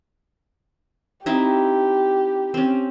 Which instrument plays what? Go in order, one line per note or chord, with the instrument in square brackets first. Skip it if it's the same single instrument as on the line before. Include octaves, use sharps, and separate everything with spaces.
[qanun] C4 D#4 E4 [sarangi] G4
[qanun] C4 C#4